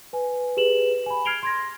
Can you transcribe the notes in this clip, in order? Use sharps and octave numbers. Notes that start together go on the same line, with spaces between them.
B4 G#5
G4 G#4 B4 E7 F#7
G#5 B5
F6 G#6 C7 D7 F7 G7
C6 G#6 A#6